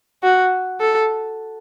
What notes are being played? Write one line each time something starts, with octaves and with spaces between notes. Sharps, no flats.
F#4
A4